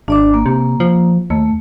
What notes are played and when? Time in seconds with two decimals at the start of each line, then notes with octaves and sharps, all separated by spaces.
0.08 G#1 D4 D5 D6
0.34 A#3
0.46 C3
0.80 F3
1.30 D#2 A3